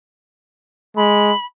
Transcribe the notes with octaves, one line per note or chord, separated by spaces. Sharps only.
G#3 B5